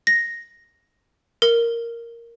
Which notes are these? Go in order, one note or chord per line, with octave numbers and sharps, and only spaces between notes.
A#6
A#4